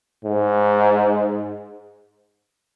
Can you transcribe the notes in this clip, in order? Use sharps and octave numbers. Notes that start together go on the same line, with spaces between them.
G#2